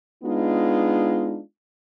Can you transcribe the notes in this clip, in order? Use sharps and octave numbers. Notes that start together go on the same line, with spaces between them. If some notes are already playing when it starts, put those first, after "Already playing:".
G#3 B3 D4 D#4 F4